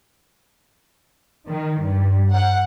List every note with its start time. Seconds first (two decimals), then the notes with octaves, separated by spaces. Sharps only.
1.49 D#3
1.82 G2
2.32 F#5